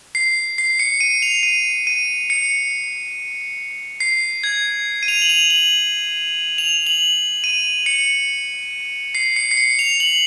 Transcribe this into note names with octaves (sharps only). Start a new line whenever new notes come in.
C7
C7
C#7
D#7
F7
D#7
D#7
C#7
C7
G#6
D#7
F7
F#7
F7
F#7
F7
F#7
D#7
C#7
C7
C#7
C7
C#7
F7
F#7